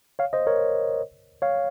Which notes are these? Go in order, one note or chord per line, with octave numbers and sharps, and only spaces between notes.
C#5 F5
C5 D#5
A#4 C#5
C#5 F5